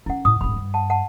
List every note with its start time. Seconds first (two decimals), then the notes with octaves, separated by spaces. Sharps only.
0.06 D#3 C#4 E4 F#5
0.25 A2 D#6
0.41 D#1 G#1 B5
0.56 G2
0.74 F#5 A5
0.90 F#5 A5